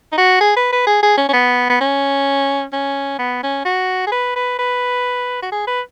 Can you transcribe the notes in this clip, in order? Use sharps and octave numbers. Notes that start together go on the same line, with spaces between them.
D#4
F#4
G#4
B4
B4
G#4
G#4
C#4
C#4
B3
B3
C#4
C#4
B3
C#4
F#4
G#4
B4
B4
B4
F#4
G#4
B4